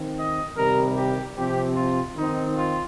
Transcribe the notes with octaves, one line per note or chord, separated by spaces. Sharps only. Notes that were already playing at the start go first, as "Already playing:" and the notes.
Already playing: D#3 C4
D#5
C3 D#3 G3 A#4
G4
C3 F3 C4 G4
F4
D#3 C4 D#4
F4